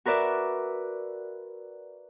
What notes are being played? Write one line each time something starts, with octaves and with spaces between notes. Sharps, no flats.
F#4 A#4 B4 D5 E5